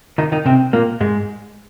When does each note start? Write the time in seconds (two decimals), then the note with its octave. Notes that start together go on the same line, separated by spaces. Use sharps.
0.18 D#3 D#4
0.32 D#3 D#4
0.46 C3 C4
0.73 A#2 A#3
1.01 G#2 G#3